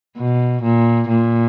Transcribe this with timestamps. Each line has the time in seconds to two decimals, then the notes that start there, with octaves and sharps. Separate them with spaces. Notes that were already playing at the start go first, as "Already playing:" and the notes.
0.18 B2
0.62 A#2
1.08 A#2